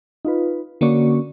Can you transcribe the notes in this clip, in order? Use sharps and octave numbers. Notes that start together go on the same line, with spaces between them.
D#4 F4 B4
D3 A#3 C#4 F#4 D5 C#6